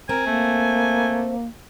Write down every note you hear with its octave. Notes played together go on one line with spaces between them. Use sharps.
C4 A#4 G#5
A3 A#3